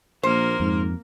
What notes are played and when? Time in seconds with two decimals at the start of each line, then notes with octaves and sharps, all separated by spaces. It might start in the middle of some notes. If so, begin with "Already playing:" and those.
0.23 A#1 A#3 A#4 C5
0.60 F2 G#2